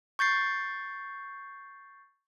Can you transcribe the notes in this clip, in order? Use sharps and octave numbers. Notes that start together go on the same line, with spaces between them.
C#6 G6 A6 C7